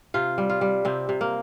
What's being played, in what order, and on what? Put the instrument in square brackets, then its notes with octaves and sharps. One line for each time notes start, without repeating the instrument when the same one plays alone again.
[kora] C3 F4
G3
F4
G3
C3 C4
C3
A#3